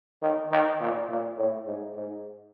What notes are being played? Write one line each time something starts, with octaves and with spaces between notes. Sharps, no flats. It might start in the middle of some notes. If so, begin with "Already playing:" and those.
D#3
D#3
A#2
A#2
A2
G#2
G#2